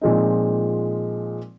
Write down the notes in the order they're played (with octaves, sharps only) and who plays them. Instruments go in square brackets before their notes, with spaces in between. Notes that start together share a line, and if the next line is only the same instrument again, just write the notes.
[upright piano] A#2 F3 G#3 C4 D#4